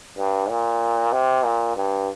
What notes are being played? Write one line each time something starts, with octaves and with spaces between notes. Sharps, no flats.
G2
A#2
C3
A#2
G2